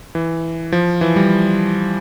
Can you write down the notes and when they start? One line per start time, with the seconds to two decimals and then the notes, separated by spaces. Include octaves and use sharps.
0.15 E3
0.72 F3
1.01 E3
1.16 G3